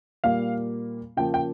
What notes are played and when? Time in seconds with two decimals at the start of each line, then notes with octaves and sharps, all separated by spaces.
0.24 A#2 G3 A#3 F5
1.17 C#3 F3 A#3 G5
1.34 G5